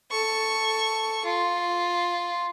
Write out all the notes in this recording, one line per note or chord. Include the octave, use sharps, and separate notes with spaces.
A4 C#6
F4